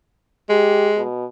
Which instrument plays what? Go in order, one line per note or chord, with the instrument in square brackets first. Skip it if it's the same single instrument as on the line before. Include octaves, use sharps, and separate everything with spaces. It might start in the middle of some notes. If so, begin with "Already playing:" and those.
[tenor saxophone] G#3 [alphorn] G4
[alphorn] B2